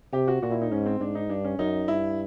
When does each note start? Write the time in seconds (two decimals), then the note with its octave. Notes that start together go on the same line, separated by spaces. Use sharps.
0.13 C3 G4
0.28 F#4
0.43 A#2 F#4
0.52 E4
0.61 D#4
0.71 G#2 C#4
0.86 C4
1.00 G#2 D4
1.15 D#4
1.29 G2 D4
1.44 C#4
1.58 F#2 D#4
1.88 G2 E4